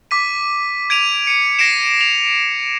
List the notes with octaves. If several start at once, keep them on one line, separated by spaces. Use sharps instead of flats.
D6 B6 D#7
G#6 D7 D#7 F7
C#7 D#7
A#6 C7 D7 E7
F7